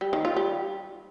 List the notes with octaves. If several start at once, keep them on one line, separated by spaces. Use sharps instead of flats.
G3
D#3
F4
G3